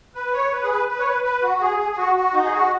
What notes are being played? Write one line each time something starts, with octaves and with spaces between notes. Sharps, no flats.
B4
C#5
B4
G#4
B4
B4
C#5
B4
B4
F#4
G#4
G#4
G#4
F#4
F#4
D#4
G#4
F#4